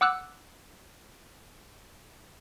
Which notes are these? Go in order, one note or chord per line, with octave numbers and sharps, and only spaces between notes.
F#5 D6 E6 F#6